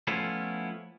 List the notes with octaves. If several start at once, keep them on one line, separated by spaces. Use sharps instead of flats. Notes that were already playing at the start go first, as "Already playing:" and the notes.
F3 A3 B3 C#4 E4 F4